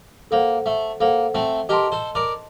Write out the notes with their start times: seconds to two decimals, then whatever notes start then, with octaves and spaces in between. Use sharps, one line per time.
0.31 A#3 A4 C5 F#5
0.66 A3
1.00 A#3 A4 C5 F#5
1.35 A3 C4
1.69 G4 A#4 D#5 A5 C6
1.92 A4 C5
2.15 A#4 D5